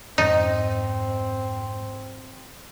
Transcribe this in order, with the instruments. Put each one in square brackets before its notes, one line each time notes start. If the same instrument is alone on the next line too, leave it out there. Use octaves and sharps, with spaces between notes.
[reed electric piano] F2 G#2 [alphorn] C4 [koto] D#4